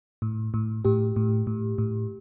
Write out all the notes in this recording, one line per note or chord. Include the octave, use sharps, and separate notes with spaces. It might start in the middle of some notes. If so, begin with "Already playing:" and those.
A2
A2
A2 G4
A2
A2
A2